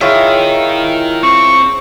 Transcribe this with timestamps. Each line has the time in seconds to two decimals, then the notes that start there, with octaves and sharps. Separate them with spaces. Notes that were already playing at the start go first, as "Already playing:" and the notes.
0.01 E4 F4 G#4 A#4 C#5 D#5 F5 G5
1.23 C4 C#6